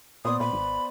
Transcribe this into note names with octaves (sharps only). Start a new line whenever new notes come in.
A#2 B3 C5 D5 D#6
A#2 B5
G#1